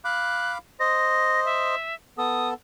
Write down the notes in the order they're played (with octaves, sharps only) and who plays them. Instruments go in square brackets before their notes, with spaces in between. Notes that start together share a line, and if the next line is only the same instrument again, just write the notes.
[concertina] F5 B5 D6 [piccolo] F#6
[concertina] C5 D#5 [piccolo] A#6
[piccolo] E5
[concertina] B3 A4 [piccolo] D#6